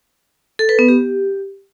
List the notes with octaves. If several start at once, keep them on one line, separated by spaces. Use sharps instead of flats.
A4
B4
B3
G4